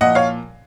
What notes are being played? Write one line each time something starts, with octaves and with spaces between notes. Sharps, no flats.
A#2 F3 D#5 F#5
C#5 F5